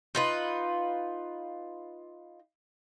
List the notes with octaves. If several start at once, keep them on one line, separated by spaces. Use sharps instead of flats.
D#4 F4 B4